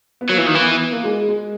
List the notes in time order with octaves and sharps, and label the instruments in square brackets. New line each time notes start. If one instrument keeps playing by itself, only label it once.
[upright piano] B3
[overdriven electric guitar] F#3 [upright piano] A#3
[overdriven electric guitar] E3
D#3
E3
[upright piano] B3
A#3
G#3
G#3